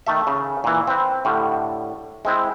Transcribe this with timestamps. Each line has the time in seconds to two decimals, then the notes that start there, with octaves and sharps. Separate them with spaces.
0.06 D#3 A3 A4 E5
0.27 C#3
0.64 A#2 E3
0.87 C4 B4
1.25 A2 D3 G3
2.25 G#3 C4 E4